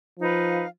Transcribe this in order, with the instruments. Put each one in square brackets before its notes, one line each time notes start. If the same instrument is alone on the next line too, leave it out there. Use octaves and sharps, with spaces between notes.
[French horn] F3 [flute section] D#4 B4 F5